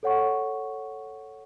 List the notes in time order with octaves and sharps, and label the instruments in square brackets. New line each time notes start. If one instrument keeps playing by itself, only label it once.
[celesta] A4 C#5 F#5 C#6